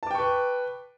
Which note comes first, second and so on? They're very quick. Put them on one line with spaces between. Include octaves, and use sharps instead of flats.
A5 D6 G5 C#6 B4